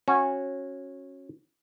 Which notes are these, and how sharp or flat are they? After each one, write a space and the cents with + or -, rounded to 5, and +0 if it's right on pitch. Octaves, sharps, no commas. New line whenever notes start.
C#4 -15 F#4 -15